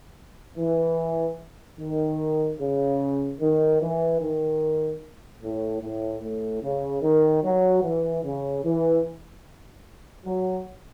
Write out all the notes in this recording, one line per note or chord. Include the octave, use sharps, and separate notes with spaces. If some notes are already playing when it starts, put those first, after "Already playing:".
E3
D#3
C#3
D#3
E3
D#3
A2
A2
A2
C#3
D#3
F#3
E3
C#3
E3
F#3